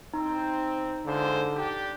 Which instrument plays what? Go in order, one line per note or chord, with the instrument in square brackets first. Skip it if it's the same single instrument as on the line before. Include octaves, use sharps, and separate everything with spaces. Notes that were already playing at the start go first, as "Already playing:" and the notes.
[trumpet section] C4 [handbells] D#4
[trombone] D3 [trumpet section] G#3 F4 C5
[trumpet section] D4 G4